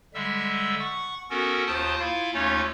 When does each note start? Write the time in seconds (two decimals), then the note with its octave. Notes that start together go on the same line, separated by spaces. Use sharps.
0.14 D3 G3 G#3 E5 E6
0.79 F#5 C#6
1.30 B3 C#4 F#4 A4 A#4
1.67 D#2 F4 C5 G5 A5 D#6
1.99 E4 F4 F5
2.34 D#2 A3 C#4 D#4 F4 C#5